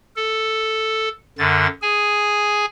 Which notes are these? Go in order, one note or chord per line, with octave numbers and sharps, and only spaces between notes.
A4
F#2 D3 A6
G#4 G#5